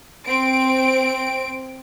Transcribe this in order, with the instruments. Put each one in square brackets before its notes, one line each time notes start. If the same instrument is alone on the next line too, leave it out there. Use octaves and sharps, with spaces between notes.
[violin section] C4 D7